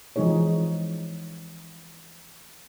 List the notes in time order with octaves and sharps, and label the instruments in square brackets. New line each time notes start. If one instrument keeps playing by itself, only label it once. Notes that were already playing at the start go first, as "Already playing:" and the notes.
[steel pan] E3 F3 G#3 D#4 G#4 C#5